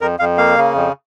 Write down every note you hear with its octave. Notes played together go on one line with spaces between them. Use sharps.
F2 A#4
F2 F5
A#3 F5
C#3
F2